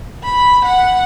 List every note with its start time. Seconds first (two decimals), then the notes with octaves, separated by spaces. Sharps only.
0.23 B5
0.65 F#5